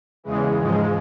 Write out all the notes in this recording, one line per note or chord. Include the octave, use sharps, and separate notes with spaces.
E2 C#3 E3 G#3
G#2 F3 G#3